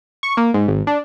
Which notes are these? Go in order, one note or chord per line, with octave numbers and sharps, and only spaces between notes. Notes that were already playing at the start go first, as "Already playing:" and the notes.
C#6
A#3
G#2
G#1
D4